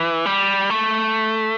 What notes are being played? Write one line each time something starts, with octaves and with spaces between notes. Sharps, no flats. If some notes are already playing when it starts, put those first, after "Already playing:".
Already playing: E3
G3
A3